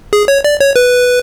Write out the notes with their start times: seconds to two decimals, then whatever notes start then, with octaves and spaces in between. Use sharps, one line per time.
0.13 G#4
0.28 C#5
0.44 D5
0.60 C#5
0.76 B4